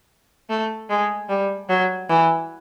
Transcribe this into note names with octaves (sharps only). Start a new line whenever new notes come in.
A3
G#3
G3
F#3
E3